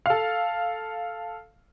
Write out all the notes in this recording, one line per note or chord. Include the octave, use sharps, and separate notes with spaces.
A4 F5